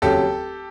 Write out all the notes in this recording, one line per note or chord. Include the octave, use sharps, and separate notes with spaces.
F1 D#2 C#3 F#3 G4 A4